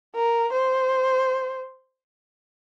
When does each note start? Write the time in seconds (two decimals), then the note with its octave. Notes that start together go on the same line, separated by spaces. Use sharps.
0.15 A#4
0.52 C5